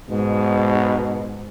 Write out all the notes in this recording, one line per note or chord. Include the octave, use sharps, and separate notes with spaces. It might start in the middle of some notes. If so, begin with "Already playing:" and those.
G#2 B2